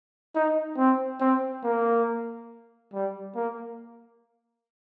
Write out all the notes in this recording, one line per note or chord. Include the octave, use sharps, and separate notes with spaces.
D#4
C4
C4
A#3
G3
A#3